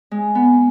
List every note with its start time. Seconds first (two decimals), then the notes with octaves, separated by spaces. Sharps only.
0.11 G#3
0.35 B3